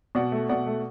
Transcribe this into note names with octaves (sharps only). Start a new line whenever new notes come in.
B2 D5 F#5
A3
B2 D5 F#5
A3